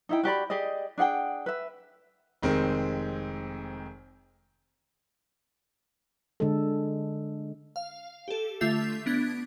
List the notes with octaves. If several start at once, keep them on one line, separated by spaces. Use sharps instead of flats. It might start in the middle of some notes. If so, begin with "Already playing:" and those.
D#4 E4 G5
F#4 G4 D5 B5
G4 G#4 D5 D#5
D4 G#4 F#5 G5
B4 E5
F1 D#3 G#3 C4
D3 G#3 A4
F5
G4 A4
D3 A3 F4 E5 G6 C7
B3 D4 F#6 G#6